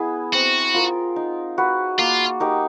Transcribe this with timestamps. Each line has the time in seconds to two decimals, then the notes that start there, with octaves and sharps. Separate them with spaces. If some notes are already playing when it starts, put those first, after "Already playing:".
Already playing: B3 E4 G#4 B4
0.34 C4 F#4
0.74 F4 A#4
1.16 D#4
1.58 F#4 B4
1.99 A#3 F4
2.40 D#4 G4 A#4